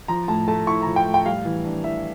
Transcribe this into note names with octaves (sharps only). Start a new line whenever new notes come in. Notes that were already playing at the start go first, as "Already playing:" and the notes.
F3 A#5
A2 A5
A3 A5
E4 C#6
F3 A#5
G5
A2
G5
G3 F5
E3
D4
E3 E5